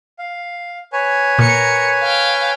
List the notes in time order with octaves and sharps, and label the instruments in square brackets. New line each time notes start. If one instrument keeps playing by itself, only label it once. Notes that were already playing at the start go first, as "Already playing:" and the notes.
[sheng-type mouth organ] F5
B4 C#5 G#5
[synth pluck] A#2 [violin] A#4 C#7
[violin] F5 G5